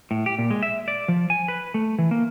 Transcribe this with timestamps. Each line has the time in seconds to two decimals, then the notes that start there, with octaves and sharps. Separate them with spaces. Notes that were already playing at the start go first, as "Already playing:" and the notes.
0.11 A2
0.26 G4
0.39 A#2
0.51 G#3
0.63 E5
0.88 D5
1.08 F3
1.30 G#5
1.48 B4
1.74 A3
1.99 E3
2.11 A#3